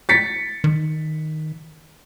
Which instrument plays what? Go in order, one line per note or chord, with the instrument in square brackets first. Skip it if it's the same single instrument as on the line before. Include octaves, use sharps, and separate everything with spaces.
[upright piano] A6 B6 C#7
[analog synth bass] D#3